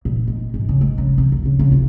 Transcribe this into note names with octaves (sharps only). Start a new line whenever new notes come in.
A#2
G#3
G#2
C#3
G#3
C#3
C3
D2
C#3
C#3
F4